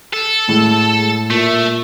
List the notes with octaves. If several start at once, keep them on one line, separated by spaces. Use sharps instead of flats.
A4
A2 G#3
A#2 A3